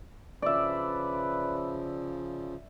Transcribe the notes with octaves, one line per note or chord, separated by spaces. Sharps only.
C#3 F3 B4 D5 E5